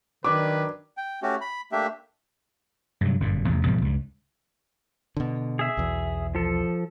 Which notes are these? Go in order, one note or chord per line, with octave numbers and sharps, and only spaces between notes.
D#3 F#3 D4 B4 D6
G5
A3 C#4 F#4 G4
B5
A3 A#3 D4 G4 E5
G2 C3 F#3
G1 F#2 A#2
A1 E2 C3
G#2 B2 F3 G3
C#2 G2
B2 D3
G#4 E5
B1 E2
F3 A4